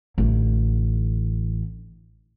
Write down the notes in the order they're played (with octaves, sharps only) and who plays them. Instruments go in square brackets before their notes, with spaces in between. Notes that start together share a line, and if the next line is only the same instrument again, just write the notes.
[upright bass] A1 D3